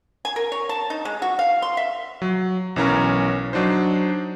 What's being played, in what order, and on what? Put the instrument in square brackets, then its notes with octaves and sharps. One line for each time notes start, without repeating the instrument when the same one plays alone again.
[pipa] G#5
A#4
C#5
A5
D#4
G#3
F#4
F5
C6
E5
[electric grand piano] F#3
B1 E3 C#4 A#4 A#5
F#3 D4 D#4 C5